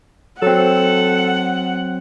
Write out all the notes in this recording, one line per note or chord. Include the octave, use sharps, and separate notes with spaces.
F#3 C4 A4 F#5